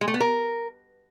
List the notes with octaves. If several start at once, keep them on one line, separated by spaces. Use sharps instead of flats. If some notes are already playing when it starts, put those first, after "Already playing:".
G#3
A3
B3
A#4